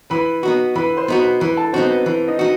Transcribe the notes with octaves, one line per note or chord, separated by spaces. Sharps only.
E3 B4 B5
B3 D#4 F#4
E3 B4 B5
C5 C6
B3 D#4 F#4
B4 B5
E3 B4 B5
A4 A5
B3 C4 D#4 F#4 C5
B4
E3 B4
D#4 D#5
D#4 F#4